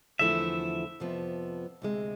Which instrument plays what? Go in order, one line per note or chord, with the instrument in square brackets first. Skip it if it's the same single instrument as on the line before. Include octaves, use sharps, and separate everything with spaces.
[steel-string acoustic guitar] E2 D3 F3 A3 E4 [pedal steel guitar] E5
[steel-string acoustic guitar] F2 C3 F3 B3
D2 C3 G#3